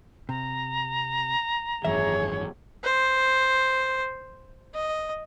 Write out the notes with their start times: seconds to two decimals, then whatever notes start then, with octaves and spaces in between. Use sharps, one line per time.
0.29 C3 A#5
1.84 G#1 F#2 E3 G#4 C#5 E5
2.83 C5
4.74 D#5